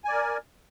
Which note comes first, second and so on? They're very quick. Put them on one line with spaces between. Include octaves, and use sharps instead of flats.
G#5 D5 A#4